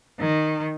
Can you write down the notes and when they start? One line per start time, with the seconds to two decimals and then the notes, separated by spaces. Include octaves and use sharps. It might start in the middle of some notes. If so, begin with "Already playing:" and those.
0.20 D#3